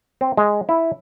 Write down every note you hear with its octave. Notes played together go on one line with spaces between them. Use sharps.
C4
G#3
E4